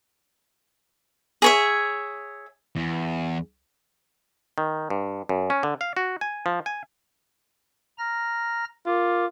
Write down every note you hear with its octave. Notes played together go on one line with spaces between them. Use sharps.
G#4 C#5 E5
E2
D#3
G2
F#2
C#4
D3
F5
F#4
G#5
F3
G#5
A#5 F6 A#6
F4 A#4 D6